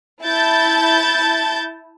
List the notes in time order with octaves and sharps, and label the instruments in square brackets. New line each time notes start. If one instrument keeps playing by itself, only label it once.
[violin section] E4 A5 G6 A6